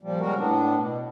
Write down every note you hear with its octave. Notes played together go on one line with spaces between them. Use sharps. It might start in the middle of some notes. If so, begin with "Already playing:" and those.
A#2 F3 G3
C#3 G3 G#3 F#4 A#4
A2 B3 D4
B2